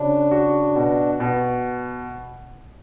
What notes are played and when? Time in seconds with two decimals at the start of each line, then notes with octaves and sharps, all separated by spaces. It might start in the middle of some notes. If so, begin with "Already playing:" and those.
Already playing: C#3 D4 F#4
0.31 F#4
0.76 B2
1.20 B2